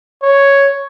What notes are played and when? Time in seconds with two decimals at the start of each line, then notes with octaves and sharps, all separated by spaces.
0.23 C#5